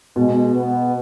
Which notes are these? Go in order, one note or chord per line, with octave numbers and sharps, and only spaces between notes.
B2 G#3
B3